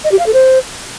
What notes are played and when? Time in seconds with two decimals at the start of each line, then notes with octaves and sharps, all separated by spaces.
0.04 D#5
0.11 G4
0.18 F5
0.26 A4
0.33 C5